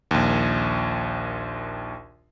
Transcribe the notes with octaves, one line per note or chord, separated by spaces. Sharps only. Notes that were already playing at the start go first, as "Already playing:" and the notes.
A#1 D#2